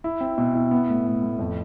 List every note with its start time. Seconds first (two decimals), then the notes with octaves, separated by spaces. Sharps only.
0.04 E4
0.21 C4
0.38 B2
0.55 E4
0.71 B3
0.89 A2
1.06 A2
1.23 A2
1.39 F2